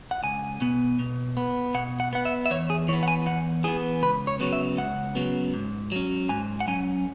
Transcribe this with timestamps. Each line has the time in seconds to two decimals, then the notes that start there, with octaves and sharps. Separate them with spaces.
0.11 F#5
0.23 C#2 G#5
0.61 B2 B3
0.99 B2
1.37 B3
1.74 B2 F#5
2.00 F#5
2.13 B3 F#5
2.25 E5
2.46 E5
2.51 E2 C#5
2.70 G#4
2.88 E3 C#5
2.93 B3
3.03 F#5
3.08 G#5
3.26 E2 F#5
3.64 E3 B3 G#4
4.02 C#2 B4
4.27 C#5
4.40 C#3 F#3 B3
4.53 E5
4.77 C#2 F#5
5.15 C#3 F#3 B3
5.54 G#2
5.92 F#3 C#4
6.29 G#2 G#5
6.61 F#5
6.67 F#3 C#4 G#5